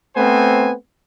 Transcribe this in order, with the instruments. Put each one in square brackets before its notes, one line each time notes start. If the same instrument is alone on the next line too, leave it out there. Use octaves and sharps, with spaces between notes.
[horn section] A3 B3 C4 C5 G#5